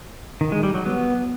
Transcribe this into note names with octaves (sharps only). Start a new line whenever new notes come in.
D#3
G#3
G3
F#3
B3